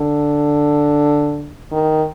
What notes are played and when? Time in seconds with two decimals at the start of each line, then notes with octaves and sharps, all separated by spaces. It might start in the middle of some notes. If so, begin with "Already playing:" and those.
Already playing: D3
1.72 D#3